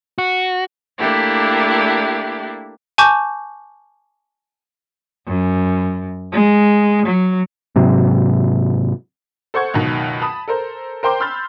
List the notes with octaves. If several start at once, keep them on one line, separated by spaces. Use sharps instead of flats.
F#4
A3 A#3 D4 E4 G4
G#5 A5 C#6 D6 G6
F#2
G#3
F#3
G#2 C3 F#3
A4 C5 F#5 C#6 G#6
C#2 F#2 B2 D#3
A5 B5 D#6
A4 A#4 C5
A#4 C5 G5 C6 D6
B5 C6 E6 F6 G6 A6